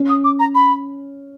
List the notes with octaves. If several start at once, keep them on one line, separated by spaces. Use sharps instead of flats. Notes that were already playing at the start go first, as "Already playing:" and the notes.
Already playing: C#4
D#6
D6
A#5
B5